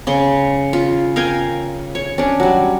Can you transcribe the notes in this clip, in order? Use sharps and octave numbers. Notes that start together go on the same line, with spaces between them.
C#3 C6
F4
A#4 F5 G5 G#5
C#5
C#4 D4
F#3 G3